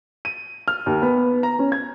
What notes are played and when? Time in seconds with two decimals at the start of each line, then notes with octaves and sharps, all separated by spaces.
0.25 D#7
0.68 F6
0.86 D#2
1.02 B3
1.43 A#5
1.59 C#4
1.72 G#6